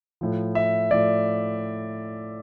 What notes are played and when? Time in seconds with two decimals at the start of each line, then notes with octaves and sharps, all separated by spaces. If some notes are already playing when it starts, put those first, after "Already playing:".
0.21 A2 F3
0.55 E5
0.91 A2 F3 D5